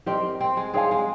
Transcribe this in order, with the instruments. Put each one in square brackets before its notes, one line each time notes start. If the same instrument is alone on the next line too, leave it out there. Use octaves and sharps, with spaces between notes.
[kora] C4 [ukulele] G4 A#4 D#5
[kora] C4
G#3
[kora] C4 [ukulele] G#4 C#5 F5 G#5
[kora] G#3